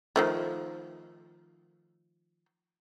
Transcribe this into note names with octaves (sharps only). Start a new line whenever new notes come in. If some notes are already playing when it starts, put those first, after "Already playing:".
D#3 F3 A3